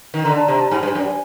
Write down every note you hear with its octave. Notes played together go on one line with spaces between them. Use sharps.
D#3
D3 A#5
A5
C3 A#5
A5
G#2 G#5
G2
F#2